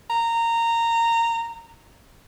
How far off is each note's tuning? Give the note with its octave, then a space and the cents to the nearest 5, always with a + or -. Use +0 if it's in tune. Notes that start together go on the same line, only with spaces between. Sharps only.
A#5 -15